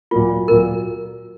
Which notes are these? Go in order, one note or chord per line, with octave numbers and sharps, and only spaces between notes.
A#2 F#3 A#3 F4
A#2 F#3 A#3 A#4